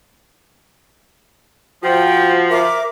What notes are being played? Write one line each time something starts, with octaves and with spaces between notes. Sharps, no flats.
F3 F#4 G5
A#4 E5 D6